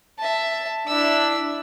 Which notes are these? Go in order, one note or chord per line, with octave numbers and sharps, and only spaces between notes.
E5 A5
D4 E4 E6